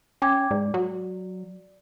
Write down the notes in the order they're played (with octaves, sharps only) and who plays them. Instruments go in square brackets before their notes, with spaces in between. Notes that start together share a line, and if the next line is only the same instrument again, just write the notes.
[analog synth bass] C#4 [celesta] G5 D6 G#6
[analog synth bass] G#2 [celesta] D5
[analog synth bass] F#3